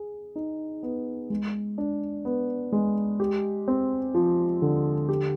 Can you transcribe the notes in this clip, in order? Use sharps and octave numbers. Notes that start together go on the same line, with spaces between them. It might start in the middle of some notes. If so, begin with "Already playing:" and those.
Already playing: G#4
D#4
B3
G#3
D4
B3
G#3
G4
C4
F3
D3
G4